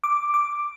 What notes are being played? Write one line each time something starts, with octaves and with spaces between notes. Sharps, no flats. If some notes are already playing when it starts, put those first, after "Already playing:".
D6
D6